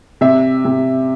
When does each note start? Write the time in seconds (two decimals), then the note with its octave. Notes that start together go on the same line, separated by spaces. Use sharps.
0.21 C3 E5
0.65 C3